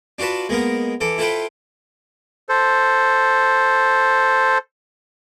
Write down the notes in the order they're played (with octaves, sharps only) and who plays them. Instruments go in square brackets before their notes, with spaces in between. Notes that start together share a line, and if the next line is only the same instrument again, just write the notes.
[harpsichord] D4 F4 F#4 B4 A5
G#3 A#3 B3 A#4
E3 A4 D6
E4 F4 A4 B4 C5 G5
[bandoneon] A4 C5